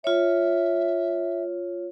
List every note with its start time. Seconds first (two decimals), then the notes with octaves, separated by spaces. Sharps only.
0.04 F4 C#5 E5